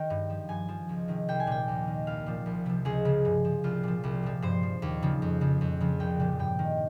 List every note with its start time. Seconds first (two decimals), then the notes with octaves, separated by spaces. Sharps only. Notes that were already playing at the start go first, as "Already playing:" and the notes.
Already playing: D#3 G5
0.10 G2
0.30 F3
0.49 G2 G#5
0.69 F3
0.89 C#2
1.08 C3 D#3
1.28 C2 G5
1.40 G#5
1.47 A#2 F3 G5
1.68 D#2
1.87 D#3
2.07 C2 F5
2.26 A#2 F3
2.46 C2
2.66 C3 F3
2.85 C#2 G#4
3.05 C#3 F3
3.25 G2
3.45 F3
3.64 C2 F4
3.83 A#2 F3
4.04 C2
4.23 A#2 F3
4.42 G2 C5
4.63 F3
4.82 D#2
5.02 C#3 F3
5.22 F2
5.41 C#3 F3
5.61 F2
5.81 C#3 F3
6.00 C2 G5
6.20 A#2 F3
6.39 G2 G5
6.59 D#3